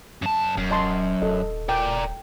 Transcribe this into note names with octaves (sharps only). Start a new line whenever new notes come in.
F#2 A5
D#1 F#2
D#5 A5 C6
D#1 A4 D#5
A#4 D5 G5